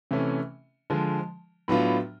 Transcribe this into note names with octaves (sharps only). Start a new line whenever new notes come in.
C3 E3 A3 C#4
D3 F3 G#3
A2 F#3 B3 D4 F4